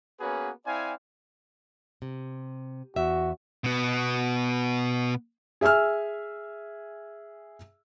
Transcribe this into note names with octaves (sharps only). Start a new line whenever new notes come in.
A#3 B3 C#4 F#4 G#4 B4
C4 E4 D5 F5 G#5
C3
E2 F#4 E5
B2 B3
G#4 E5 G#5 E6 F6